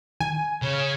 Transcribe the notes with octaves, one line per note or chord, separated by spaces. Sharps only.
D#3 G#5
C#3 C#5